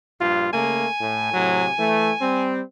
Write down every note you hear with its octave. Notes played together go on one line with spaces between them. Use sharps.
A#1 G2 F4
C#3 A3 A#3 G#5
A2
A2 C3 F#3
E3 A3
G3 C4